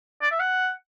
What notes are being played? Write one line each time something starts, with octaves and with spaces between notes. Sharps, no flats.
D5
E5
F#5